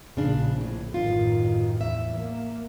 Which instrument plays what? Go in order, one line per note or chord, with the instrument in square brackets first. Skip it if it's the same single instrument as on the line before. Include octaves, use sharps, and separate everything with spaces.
[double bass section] A#1 [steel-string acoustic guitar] C#3 D4
[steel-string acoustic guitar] A2
[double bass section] A1 F#2 D#3 [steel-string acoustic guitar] F4
[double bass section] E2 E3 [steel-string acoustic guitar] E5
[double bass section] A#3